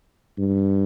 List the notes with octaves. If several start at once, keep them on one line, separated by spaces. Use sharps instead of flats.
G2